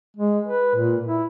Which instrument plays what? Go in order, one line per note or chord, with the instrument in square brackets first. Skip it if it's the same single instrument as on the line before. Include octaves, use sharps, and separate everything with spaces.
[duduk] G#3
B4
A#2
E4